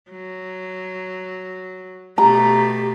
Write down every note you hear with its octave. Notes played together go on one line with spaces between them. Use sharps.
F#3
B2 A3 G4 A#5